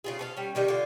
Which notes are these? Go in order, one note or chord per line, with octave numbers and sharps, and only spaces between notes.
C#3 F4 G#4
A4 B4 F5
G3 C#4
C3 D#3 G3
D3 F4